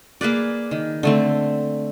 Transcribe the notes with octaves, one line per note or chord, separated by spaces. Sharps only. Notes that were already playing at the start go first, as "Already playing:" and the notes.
A#3 G#4 B4 D5
D#3
D3 A3 C4